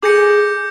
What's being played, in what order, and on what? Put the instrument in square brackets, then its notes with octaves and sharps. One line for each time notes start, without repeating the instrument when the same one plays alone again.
[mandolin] G#4 [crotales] D6 G6 A#6 C#7